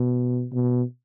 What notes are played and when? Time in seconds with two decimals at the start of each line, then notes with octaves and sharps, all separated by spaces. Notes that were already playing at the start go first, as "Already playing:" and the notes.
Already playing: B2
0.53 B2